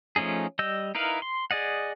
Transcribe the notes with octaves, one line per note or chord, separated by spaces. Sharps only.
F3 A3 C#4 D#4 G#4
G3 D#5 E6 G6
D#4 E4 A#4 B4 F5
C6
G#4 D5 D#5 F#5